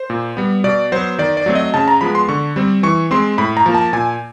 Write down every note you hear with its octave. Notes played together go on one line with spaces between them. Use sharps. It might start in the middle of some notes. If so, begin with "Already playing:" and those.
Already playing: C5
A#2
G3 B3
B2 D5
F#3 B3 C5
D#3 D5
D5
F#3 A3 C4
D#5
C#3 A5
A#5
F3 G#3 B3 B5
C6
D3 C#6
G3 C4
E3 C#6
G#3 C4 C6
A2 B5
A#5
F3 A#3
A5
A#2 G#5